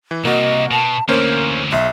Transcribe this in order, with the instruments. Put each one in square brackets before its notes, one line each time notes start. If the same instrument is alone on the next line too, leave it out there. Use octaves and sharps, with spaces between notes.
[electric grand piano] E3
[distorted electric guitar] C2 [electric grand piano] A#3 F#4 [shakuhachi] D#5
[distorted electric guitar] B2 [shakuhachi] A5
[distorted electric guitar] D2 E3 [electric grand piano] A#3 C#4 C5 [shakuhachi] A#4
[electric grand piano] B1 [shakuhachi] E5